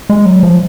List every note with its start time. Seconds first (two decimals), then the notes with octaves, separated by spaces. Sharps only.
0.10 G#3
0.26 F#3
0.43 F3